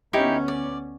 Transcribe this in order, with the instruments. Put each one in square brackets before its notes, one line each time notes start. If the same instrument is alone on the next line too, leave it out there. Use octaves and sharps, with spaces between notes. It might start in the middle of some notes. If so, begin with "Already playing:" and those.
[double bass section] D2 B3 C#4 [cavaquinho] D#4 E4 G4
[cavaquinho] D5